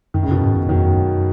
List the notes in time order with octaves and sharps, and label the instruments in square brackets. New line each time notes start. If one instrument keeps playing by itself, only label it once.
[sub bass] F#2 [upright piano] D#3
[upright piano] C#3
[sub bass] F#2 [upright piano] B2 D#3
[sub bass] G#2
F#2
[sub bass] F2 [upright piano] D#3 F#3
[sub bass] F#2